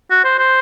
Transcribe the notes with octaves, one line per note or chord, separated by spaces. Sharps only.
F#4
C5
C5